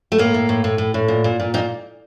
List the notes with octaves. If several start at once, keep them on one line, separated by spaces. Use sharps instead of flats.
A3
A2 A#3
A2
A2
A2
A2
A2
A#2
A#2
A#2
A#2 D#4